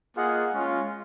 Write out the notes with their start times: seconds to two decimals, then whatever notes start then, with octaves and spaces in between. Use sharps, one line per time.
0.15 A#3 F4 G#4 D#5 F#5
0.51 G#3 C#4 F4